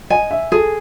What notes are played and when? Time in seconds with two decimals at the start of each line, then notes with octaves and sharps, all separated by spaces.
0.10 D#5 G#5
0.31 E5
0.52 G#4 A4